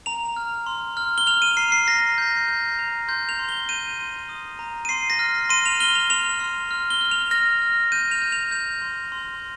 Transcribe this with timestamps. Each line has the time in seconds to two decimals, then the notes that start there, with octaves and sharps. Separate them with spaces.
0.06 A#5 F7
0.36 F6
0.66 C6
0.97 F6
1.18 G7
1.27 F6 F7
1.42 D#7
1.57 A#5 C7
1.72 C7
1.87 A#5 A#6
2.18 G6
2.48 G6
2.79 A#5
3.08 C6 G6
3.29 F7
3.39 C6
3.49 G7
3.69 G6 D#7
3.99 C6
4.29 D#6
4.59 A#5
4.85 D#7
4.89 C6 C7
5.10 A#6
5.19 F6
5.49 C6 D#7
5.66 F7
5.80 F6 G7
5.95 F7
6.10 C6 F7
6.40 C6
6.71 F6
6.90 G7
7.01 F6
7.11 F7
7.31 F6 A#6
7.62 F6
7.92 G6 D#7
8.11 F7
8.22 G6
8.32 F7
8.51 G6 F7
8.82 C6
9.12 C6